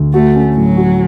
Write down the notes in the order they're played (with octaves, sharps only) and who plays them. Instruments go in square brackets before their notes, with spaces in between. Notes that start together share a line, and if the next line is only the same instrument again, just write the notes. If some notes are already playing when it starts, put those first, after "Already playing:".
Already playing: [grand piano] D2
[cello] A3 [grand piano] F#4
[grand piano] C#4
[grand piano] A2 [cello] F#3
[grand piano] F#4